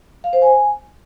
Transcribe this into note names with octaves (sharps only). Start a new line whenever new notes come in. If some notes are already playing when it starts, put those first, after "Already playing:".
F5
C5
G#5